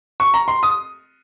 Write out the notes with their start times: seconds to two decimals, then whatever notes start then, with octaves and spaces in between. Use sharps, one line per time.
0.20 C#6
0.34 A#5
0.48 C6
0.63 D#6